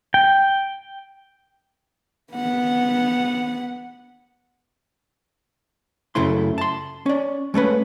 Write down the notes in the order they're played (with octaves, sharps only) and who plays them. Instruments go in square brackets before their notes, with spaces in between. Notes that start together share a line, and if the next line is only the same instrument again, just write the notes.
[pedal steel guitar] G5
[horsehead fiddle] B3 F#5
[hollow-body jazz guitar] F#2 C#3 A3 E4 C6
A5 C6
C#4 D5
G#3 A3 C#4 B4